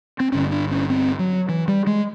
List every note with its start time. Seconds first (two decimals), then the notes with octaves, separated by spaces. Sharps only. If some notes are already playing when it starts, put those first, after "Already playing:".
0.20 C4
0.32 G1 G2 D3 C#4
0.51 D4
0.71 C#4
0.90 C4
1.19 F#3
1.49 E3
1.68 G3
1.87 G#3